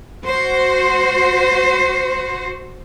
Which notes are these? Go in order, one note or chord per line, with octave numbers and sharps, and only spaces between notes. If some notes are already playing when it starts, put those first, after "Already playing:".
F#4 C5